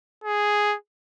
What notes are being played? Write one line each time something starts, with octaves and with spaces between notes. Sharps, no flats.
G#4